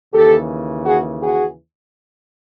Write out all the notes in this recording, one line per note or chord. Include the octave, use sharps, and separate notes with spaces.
D#2 C#3 E3 G4 A4
F#4 G#4
F#4 G#4